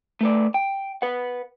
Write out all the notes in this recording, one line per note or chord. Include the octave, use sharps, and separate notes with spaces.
A3 B4 D5
G5
B4 F#5